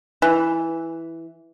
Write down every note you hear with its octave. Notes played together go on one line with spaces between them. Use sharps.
E3